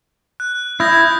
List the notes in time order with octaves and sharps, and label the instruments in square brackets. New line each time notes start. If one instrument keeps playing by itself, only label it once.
[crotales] F#6
[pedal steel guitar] E4 [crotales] D#6 G6 A#6